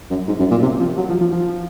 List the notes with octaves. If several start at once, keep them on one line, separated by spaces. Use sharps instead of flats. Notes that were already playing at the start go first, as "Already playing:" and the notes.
F#2
G#2
F#2
A#2
C3
F3
F#3
F3
F3
F3